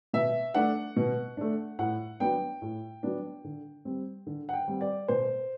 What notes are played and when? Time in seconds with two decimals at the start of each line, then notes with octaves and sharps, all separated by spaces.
0.13 B2 E5
0.54 A3 D4 F#5
0.96 B2
1.37 A3 D4
1.79 A2 F#5
2.20 F#3 B3 D4 G5
2.62 A2
3.03 F#3 B3 D4
3.44 D3
3.85 G3 C4
4.27 D3
4.49 F#5
4.53 G5
4.68 G3 C4
4.81 D5
5.08 B2 C5